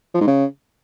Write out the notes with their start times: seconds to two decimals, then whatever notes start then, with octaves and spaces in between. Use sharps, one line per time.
0.14 F3
0.21 G#2
0.27 C#3